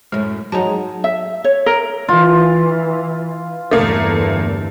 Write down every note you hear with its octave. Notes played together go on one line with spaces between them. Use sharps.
F#2 A2 G#3
G#2 F#3 G#3 D#4 A5
E5
C#5
A#4
E3 F4
G1 E2 A3 A#3